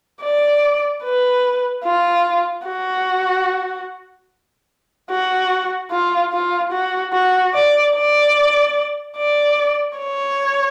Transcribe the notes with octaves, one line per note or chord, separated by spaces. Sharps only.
D5
B4
F4
F#4
F#4
F4
F4
F#4
F#4
D5
D5
D5
C#5